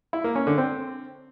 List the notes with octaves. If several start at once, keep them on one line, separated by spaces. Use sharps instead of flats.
E4
A#3
C#4
D3
C4